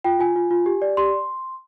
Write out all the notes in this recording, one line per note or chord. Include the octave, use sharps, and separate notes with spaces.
F4 G5
F4 G#5
F4
F4
G4
D5
G4 C6